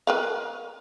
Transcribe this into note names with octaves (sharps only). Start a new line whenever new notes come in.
A#4 B4 F5